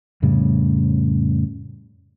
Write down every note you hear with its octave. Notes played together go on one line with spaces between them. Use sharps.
F2 A2 C#3 G3